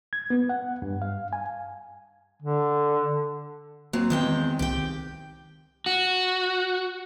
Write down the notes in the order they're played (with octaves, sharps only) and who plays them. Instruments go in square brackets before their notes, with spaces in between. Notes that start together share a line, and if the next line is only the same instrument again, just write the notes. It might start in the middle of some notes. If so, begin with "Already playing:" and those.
[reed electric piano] G#6
B3
F#5
G2
F5
G#5
[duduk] D3
[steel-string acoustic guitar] F#3 [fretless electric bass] A#3 [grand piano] C4
[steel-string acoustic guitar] E2 G#3 G5 [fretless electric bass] D#3
[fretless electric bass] C2 D#3 [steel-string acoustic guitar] G4 G5
[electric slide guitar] F#4